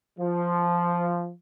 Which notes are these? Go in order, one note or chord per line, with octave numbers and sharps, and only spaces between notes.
F3